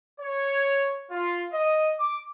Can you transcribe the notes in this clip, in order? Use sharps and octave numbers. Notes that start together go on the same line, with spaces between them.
C#5
F4
D#5
D6